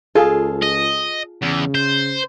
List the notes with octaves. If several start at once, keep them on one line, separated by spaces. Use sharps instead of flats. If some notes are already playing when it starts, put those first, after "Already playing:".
C#2 F4 G#4 A4
D#5
E2 C#3
C5